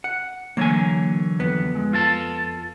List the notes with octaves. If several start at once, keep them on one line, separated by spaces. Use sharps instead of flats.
F#5
D3 E3 F#3 A#3 C#5 G#5
F2 B3
G#3
F4 A4 A5